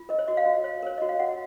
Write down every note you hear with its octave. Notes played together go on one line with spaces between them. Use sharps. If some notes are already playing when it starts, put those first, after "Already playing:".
Already playing: F4
A#4 D#5
C#5
F#4 D#5
F5
F#4
C#5
A#4 C#5
F#4 D#5
F5
F#4 F#5